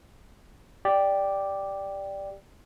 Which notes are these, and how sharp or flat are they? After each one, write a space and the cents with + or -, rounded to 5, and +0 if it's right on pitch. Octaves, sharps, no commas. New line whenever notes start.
G4 +0 D5 +0